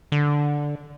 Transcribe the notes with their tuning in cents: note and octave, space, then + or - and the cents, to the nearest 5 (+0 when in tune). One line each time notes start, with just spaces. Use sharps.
D3 +0